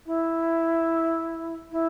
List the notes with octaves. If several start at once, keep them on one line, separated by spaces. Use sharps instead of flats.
E4
E4